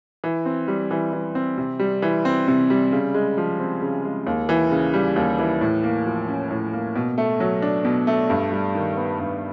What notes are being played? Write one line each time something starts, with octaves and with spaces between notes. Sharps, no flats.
E3
C4
G3
E3
E3
C4
C3
G3
E3
C4
C3
G3
C#3
G#3
F3
C4
C#3
G#3
D#2
E3
C#3
G3
D#2
E3
A2
A#3
F3
C#4
A2
A#3
B2
A3
F#3
D4
B2
A3
G2
G3
D#3
B3
G2